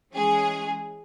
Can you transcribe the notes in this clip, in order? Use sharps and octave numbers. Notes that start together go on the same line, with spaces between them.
E3 G#3 C#4 G#4